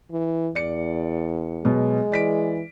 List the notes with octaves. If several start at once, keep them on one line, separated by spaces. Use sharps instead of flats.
E3
E2 D5 C#7
B2 F#3 G#3 B3
E3 D5 B6 D7